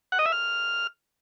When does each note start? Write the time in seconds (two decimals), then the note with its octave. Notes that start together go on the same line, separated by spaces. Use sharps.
0.12 F#5
0.19 D#5
0.26 E5
0.32 F6